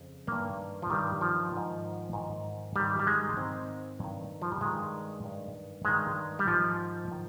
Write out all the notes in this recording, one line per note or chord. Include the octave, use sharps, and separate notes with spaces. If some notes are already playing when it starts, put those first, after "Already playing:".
Already playing: F2 C#3
G2 D#3 A#3
F3
G2 D#3 G3
F3
G#2 D#3
G#2 D#3
G#2 D#3 G3
G3
G#3
G#2 D#3 C4
G2 D#3
F3
G3
G2 D#3 G#3
G2 D#3
G2 D#3 G#3
G3
G#2 D#3 F3
D#3